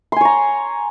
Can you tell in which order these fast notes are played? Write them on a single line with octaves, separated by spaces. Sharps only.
C6 G#5 C#5 A#5